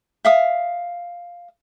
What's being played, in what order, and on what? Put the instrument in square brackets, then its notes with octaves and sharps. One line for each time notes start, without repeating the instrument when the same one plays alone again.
[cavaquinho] E5 F5 D#6